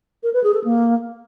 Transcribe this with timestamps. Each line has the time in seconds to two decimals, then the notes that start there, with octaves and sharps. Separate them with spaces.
0.23 A#4
0.33 B4
0.44 G#4
0.54 A4
0.64 A#3